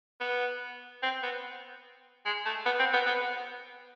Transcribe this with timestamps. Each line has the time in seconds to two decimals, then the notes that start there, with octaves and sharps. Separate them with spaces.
0.21 B3
1.03 C4
1.23 B3
2.26 G#3
2.46 A3
2.66 B3
2.79 C4
2.94 B3
3.06 B3